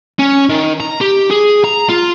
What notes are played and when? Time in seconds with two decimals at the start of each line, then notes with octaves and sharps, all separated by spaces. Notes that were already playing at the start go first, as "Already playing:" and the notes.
0.19 C#4
0.49 D#3
0.80 A#5
1.01 G4
1.31 G#4
1.65 A#5
1.89 F4